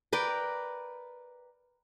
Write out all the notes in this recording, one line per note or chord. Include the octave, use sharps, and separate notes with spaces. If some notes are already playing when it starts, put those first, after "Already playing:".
A#4 B4 D5 G5